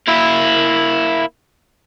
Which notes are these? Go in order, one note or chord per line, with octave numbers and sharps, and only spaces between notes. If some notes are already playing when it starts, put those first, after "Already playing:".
A#3 E4